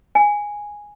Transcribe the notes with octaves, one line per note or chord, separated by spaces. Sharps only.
G#5